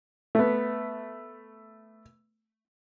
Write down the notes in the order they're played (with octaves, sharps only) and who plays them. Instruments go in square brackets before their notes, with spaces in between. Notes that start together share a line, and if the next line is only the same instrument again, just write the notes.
[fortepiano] A3 B3